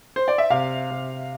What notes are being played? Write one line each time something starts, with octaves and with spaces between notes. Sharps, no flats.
C5
D5
E5
C3 F5
C3